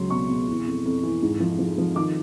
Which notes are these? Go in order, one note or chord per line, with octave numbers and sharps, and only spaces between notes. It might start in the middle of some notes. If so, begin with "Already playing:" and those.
Already playing: C#2 F#3 C6
B2 C#6
B2
E3
F2
F2
E3
G#2
F3
F3
F3
D#3 D6